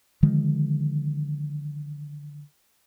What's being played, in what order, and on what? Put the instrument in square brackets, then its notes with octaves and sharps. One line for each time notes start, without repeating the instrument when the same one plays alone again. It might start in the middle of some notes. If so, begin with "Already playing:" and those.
[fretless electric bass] D3 D#3 F3 G#3